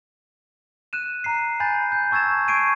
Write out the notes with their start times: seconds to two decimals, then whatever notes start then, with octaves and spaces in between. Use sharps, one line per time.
0.93 F#6 D#7 E7
1.24 A#5 C7
1.60 G#5 B5 G6 A6
1.92 G6
2.11 A5 C#6 E6 G#6 A6 E7
2.48 A5 C#6 G#6 C7 D7 D#7